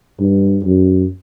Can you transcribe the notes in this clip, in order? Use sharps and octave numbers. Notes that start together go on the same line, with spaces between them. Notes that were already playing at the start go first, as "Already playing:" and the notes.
G2
F#2